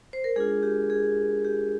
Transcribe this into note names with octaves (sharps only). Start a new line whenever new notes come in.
C5
A#4
G#3 D4 F4 G#4
G4
G#4
G4